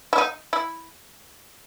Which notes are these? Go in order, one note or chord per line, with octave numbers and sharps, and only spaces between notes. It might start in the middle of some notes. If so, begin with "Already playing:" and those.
E4
D#4
E4